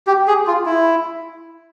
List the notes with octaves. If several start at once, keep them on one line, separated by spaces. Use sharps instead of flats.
G4
G#4
F4
E4